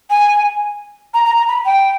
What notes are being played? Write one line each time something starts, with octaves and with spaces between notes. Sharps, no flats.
G#5
A#5
A#5
A#5
B5
G5